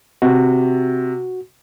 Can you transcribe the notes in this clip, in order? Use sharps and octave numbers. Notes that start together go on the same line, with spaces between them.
C3 F#4